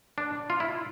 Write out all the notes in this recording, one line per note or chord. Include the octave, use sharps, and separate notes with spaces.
D4
F4
E4